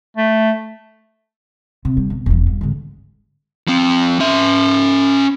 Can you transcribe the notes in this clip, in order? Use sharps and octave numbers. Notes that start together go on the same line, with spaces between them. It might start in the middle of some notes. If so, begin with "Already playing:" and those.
A3
C3
G3
B2
E1 F3
G2
G#2 D3
F3 C4
C#4 E5